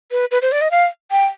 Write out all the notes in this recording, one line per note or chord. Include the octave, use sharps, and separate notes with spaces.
B4
B4
C5
D5
D#5
F5
G5